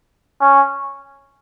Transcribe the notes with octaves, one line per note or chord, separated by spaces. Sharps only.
C#4